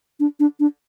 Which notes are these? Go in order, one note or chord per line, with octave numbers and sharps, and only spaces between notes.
D4
D4
D4